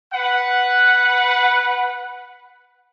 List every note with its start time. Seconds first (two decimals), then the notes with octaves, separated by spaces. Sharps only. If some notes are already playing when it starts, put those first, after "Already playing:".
0.13 B4 F#5